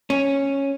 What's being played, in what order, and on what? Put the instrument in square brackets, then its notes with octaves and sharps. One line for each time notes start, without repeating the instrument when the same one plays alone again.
[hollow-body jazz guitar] C#4